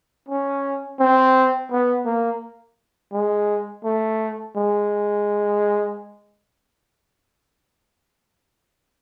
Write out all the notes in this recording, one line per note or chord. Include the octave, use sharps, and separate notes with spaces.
C#4
C4
B3
A#3
G#3
A3
G#3